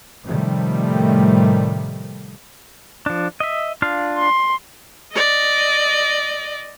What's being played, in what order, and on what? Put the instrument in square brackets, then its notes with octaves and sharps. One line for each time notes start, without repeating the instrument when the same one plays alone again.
[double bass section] A2 C3 D#3 F3 G3 A3
[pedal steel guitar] F3 D4
D#5 E5
D4 F4 F5
[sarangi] C6
[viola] D5 D#5